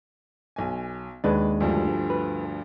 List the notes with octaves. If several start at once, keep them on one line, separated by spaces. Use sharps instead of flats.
B1 G#5
D#2 G#3 D4 B4
D2 G2 F3
B4